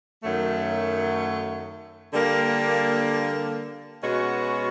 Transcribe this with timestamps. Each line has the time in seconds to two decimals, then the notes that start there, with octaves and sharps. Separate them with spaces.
0.23 F#2 D#3 F#3 A3
2.12 D3 G3 A#3
4.01 B2 G#3 C#4 F#4